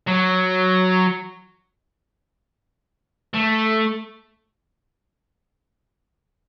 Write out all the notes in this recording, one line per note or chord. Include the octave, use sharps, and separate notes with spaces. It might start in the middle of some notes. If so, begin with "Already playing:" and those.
F#3
A3